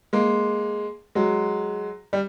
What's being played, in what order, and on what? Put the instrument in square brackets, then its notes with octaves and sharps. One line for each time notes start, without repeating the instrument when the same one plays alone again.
[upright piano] G#3 A#3
F#3 G#3
G3